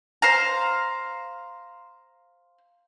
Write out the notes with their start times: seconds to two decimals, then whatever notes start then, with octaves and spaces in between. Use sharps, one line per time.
0.22 C5 F5 A#5